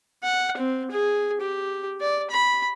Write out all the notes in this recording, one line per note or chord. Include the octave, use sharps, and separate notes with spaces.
F#5
C4
G#4
G4
D5
B5